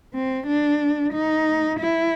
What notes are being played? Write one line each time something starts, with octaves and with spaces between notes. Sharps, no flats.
C4
D4
D#4
E4